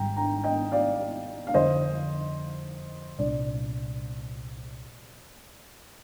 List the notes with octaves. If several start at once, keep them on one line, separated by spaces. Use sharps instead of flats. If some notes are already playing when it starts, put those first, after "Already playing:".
Already playing: G#1 G#2 G3 G5 A#5
G5 A#5
D#5 G5
D5 F5
F5
F2 D3 G3 C5 D#5
C2 A#2 G3 D4 D5